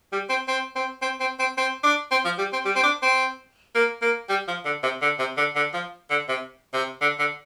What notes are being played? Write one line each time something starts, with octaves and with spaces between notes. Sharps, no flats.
G3
C4
C4
C4
C4
C4
C4
C4
D4
C4
F3
G3
C4
G3
C4
D4
C4
A#3
A#3
G3
F3
D3
C3
D3
C3
D3
D3
F3
D3
C3
C3
D3
D3